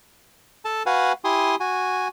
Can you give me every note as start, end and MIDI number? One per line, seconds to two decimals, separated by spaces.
0.65 0.83 69
0.65 0.83 81
0.86 1.12 66
0.86 1.12 71
0.86 1.12 77
0.86 1.12 78
0.86 1.12 80
1.24 1.55 64
1.24 1.55 67
1.24 1.55 80
1.24 1.55 84
1.24 1.55 87
1.60 2.08 66
1.60 2.08 80